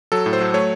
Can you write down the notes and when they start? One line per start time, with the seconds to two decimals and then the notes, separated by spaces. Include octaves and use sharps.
0.12 F#3 A4
0.26 A2
0.33 C5
0.40 F#3
0.54 A3 C#5